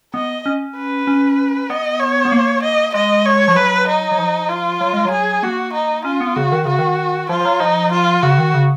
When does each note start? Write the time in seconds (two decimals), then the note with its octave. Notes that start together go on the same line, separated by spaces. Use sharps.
0.14 B3 D#5
0.46 C#4
0.76 B4
1.07 C#4
1.70 B3 D#5
2.00 C#5
2.25 B3
2.32 A#3
2.63 D#5
2.94 G#3 D#5
3.26 C#5
3.48 F3
3.56 F#3 B4
3.88 D#4
4.11 F#3
4.18 F3
4.49 F4
4.81 F#3
4.93 G#3
5.05 F#3
5.11 G#4
5.43 A#3 F#4
5.73 D#4
6.05 C#4 F4
6.21 B3
6.36 C#3 F#4
6.52 D#3
6.65 C#3 F#4
6.79 D#3
7.29 F3 F4
7.40 F3
7.45 F#3
7.60 F3 D#4
7.92 F4
8.23 C#3 F#4
8.38 D#3
8.54 C#3